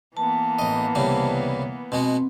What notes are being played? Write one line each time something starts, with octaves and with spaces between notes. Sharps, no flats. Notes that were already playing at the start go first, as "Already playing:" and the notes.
E3 A#3 B3 A5
A1 D#5
C2 C#3 G3
B2 G#3 C4 F#4